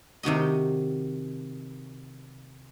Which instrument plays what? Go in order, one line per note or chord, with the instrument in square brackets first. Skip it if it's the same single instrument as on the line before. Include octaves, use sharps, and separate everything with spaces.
[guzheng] C3 D#3 F#4 D#5